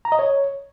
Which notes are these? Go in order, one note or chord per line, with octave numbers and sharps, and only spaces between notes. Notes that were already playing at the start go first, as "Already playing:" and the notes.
A#5
D#5
C#5